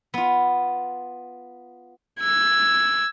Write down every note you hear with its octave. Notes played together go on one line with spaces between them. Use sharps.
B3 F4
E6 G#6